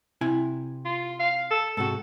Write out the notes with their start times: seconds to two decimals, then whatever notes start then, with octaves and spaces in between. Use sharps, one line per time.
0.21 C3 E4 G#5
0.85 F4
1.20 F5
1.51 A4
1.77 G#2 C3 F#4 A4